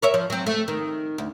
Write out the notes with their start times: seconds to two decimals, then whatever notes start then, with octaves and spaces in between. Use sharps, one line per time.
0.02 A#4 C#5 E5
0.14 F3
0.30 F#3 C4
0.46 A3
0.68 D#3
1.18 D2